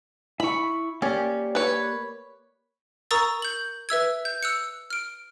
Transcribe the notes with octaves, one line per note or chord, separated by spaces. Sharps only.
E4 B5 C#6
A#3 C#4 G4 D5
B4 C#5
A#4 A#5 C#6 D#6 E6 A6
G6 F#7
B4 E5 E6 G#6
G6
E6 F#6 C#7
F6 D7